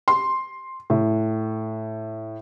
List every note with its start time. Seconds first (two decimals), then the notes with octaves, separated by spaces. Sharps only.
0.08 C6
0.90 A2